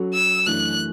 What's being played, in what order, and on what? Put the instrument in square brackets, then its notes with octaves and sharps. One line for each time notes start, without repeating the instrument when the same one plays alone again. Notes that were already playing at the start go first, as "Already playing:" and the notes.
Already playing: [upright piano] F#3 C#4 F#4 A4
[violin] E6
[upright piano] F#2 E3 A3 D4 [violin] F#6